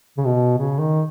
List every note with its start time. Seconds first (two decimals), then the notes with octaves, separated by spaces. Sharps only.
0.18 C#3
0.26 B2
0.58 C#3
0.80 D#3